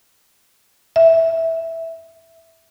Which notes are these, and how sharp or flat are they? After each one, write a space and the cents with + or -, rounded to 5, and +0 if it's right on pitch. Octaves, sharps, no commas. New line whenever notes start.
E5 -5